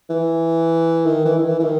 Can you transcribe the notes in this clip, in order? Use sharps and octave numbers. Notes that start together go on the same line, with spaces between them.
E3
D#3
E3
D#3
E3
E3
D#3